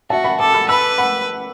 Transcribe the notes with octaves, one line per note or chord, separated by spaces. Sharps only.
F#4 E5 A5
F#5 B5
A4 A5 D6
B5 E6
B4 B5 E6
F#5 B5